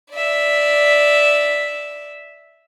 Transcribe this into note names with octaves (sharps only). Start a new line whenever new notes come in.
D5 E5